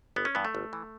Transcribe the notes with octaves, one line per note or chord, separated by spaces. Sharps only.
G1 B3
C#4
G2 E3 B3
A3
G1
E3